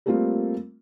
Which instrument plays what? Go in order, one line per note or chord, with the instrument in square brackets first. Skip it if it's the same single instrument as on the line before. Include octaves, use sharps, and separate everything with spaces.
[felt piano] G3 A3 A#3 C4 F4